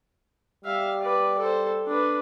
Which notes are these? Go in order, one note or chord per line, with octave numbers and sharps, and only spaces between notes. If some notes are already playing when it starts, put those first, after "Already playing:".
G3 E5 F5
B4 D5
A4 C5
D4 B4